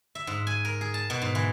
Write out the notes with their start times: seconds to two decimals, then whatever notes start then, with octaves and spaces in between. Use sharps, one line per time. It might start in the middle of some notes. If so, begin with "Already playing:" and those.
0.15 E5
0.27 G#2
0.47 G#5
0.65 A#4
0.81 G#4
0.94 A5
1.10 B2
1.22 G#2
1.35 E3